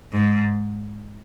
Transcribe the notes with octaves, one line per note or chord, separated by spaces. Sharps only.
G#2